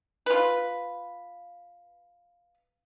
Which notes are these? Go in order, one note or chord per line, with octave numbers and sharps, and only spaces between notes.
F4 B4